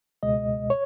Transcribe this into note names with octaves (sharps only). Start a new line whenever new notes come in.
C#2 B2 G#3 D#5
C#5